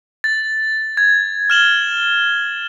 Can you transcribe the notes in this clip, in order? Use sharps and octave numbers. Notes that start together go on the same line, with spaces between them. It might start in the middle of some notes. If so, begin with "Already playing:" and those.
A6
G#6
F6 E7 F#7 G7